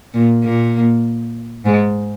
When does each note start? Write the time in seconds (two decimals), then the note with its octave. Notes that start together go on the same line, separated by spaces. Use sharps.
0.14 A#2 A#3
0.43 A#2 A#3
1.65 G#2 G#3